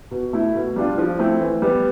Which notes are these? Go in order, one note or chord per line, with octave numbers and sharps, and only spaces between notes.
B2
A3 E4
B2
G3 D4 F4
F3
A3 C4 E4
E3
G3 B3